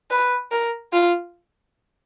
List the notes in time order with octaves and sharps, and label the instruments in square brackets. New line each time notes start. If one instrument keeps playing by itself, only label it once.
[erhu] B4
A#4
F4